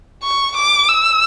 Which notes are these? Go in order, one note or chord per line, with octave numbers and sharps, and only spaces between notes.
C#6
D6
E6